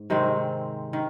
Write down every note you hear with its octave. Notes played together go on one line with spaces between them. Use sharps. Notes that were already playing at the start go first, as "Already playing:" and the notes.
Already playing: G#2
C3 D#3 G#3 C4
D#3